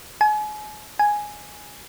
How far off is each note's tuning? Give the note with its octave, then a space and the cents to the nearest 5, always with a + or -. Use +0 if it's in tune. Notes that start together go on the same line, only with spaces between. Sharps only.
G#5 +35
G#5 +0